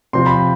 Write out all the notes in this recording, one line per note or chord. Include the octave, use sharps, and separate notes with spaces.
C3 F3 C4 F4 C6
B5